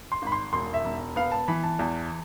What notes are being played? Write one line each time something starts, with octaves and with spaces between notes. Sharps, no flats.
C6
G#1 B5
C6
E1 C6
E5
E1
B3 F5
A5
E3 B5
A5
E2